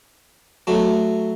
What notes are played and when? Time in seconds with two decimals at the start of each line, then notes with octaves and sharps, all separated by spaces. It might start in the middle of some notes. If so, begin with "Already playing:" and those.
0.67 F#3 A3